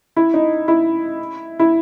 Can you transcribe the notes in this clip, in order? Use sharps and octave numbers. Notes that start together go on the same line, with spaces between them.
E4
D#4
E4
E4